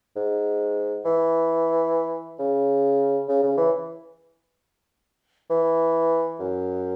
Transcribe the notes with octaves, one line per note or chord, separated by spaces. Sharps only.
G#2
E3
C#3
C#3
C#3
E3
E3
F#2